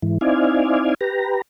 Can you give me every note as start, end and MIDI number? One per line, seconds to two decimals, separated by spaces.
0.02 0.18 44
0.02 0.18 52
0.21 0.94 60
0.21 0.94 63
0.21 0.94 64
0.21 0.94 74
0.21 0.94 77
0.21 0.94 80
1.01 1.42 67
1.01 1.42 71
1.01 1.42 82